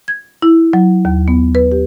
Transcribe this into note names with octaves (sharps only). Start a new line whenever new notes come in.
G#6
E4
F#3
D#2
B3
B4
G4